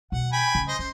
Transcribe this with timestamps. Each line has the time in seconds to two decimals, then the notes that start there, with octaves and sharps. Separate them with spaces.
0.12 B2 D#3 F#5
0.32 G5 G#5 B5
0.55 C#3
0.68 C5 D#5
0.79 C#4 C5